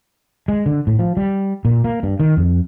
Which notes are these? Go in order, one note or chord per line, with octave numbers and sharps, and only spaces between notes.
G#3
D3
A2
F3
G3
A#2
A#3
G2
D#3
F2